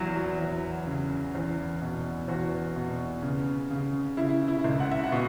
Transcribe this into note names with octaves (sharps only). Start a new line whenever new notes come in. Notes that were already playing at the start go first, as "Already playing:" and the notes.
Already playing: E2 F#3 E4
F#4
E2
C#3
E2
B2
E2 F#4
B2
C#3
C#3
C#3 E4
E4
C#2
F#5
E5
F#5
B2